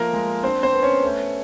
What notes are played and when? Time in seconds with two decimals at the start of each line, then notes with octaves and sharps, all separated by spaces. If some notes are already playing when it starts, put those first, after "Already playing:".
Already playing: F3 A3 A#3 A#4
0.13 G#3
0.43 C4 D4 C5
0.63 C4 C5
0.73 B3
0.83 C#4 C#5
1.03 A3